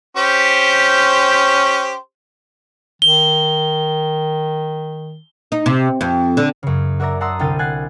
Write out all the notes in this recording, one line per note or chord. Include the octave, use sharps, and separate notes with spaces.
C#4 G4 C5
D#3 G7
D#4
C3
F2
D3
F#2 C#3
F#4 A#4 D5 E5 A#5 A#6
F#5 A5 A#5 C6 D#6 E6
C2 D3 G5 F6 A6 D#7
F#5 G#5 F#6 G#6 A6 C7